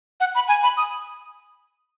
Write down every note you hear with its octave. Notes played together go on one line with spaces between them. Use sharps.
F#5
B5
G#5
B5
D#6